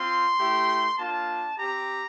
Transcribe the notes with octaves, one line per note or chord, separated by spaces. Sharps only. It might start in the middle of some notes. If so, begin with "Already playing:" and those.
Already playing: C4 F4 C6
A3 E4 G4
A#3 D4 F4 A5
C4 G4 A#5